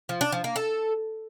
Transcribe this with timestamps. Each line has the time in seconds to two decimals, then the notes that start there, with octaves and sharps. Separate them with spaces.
0.09 F3
0.21 D4
0.32 F3
0.44 A#3
0.56 A4